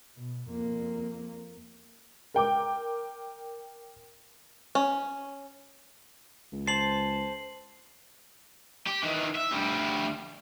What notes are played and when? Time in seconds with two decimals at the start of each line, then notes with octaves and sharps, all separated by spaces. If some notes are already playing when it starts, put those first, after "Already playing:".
0.18 B2
0.50 F2 A#3
2.34 A#4 G5 D6
4.75 C#4
6.53 C#2
6.67 C5 A5 C7 F#7
8.87 G4
9.03 D#3 E3
9.35 E5
9.52 D2 G3